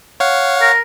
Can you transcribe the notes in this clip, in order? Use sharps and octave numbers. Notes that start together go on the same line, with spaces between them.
C#5 F5 F#5
A#4